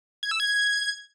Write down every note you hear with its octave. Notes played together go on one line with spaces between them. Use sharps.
G#6
E6
G#6